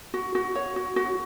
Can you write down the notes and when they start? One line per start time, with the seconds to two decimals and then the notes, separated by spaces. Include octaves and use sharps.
0.14 F#4
0.35 F#4
0.55 C#5
0.76 F#4
0.96 F#4